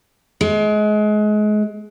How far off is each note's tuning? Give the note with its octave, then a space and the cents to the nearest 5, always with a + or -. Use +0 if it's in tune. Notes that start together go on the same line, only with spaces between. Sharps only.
G#3 +30